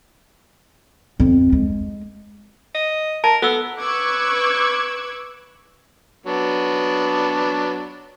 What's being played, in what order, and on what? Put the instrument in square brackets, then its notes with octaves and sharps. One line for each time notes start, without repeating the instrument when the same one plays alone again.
[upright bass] F2
G#3
[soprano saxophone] D#5
[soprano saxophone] A#4 [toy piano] A5
[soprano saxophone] B3 [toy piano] A4 E6
[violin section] B4 C#6 D6 E6 F#6 G#6
[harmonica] F#3 B3 D4